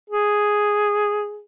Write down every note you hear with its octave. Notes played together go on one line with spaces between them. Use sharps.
G#4